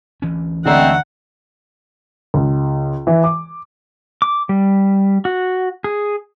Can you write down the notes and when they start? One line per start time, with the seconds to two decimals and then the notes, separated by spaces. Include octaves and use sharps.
0.22 D2 E3 C#4
0.65 D3 G#3 A3 C4 D5 F#5 A#5
2.34 C#2
3.07 E3
3.24 D6
4.22 D6
4.49 G3
5.25 F#4
5.84 G#4